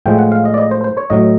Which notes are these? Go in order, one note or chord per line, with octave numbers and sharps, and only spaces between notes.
A2 F3 G#3 G5
F#5
F5
D#5
D5
D#5
C5
C5
C#5
A2 F#3 D#5